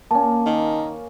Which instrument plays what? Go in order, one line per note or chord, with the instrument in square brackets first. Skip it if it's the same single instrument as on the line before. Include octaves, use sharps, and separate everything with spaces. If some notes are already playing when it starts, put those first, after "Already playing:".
[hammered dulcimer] A#3 C#4 [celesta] A5
[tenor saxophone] D#3